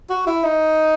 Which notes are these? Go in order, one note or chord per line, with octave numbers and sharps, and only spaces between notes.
F#4
E4
D#4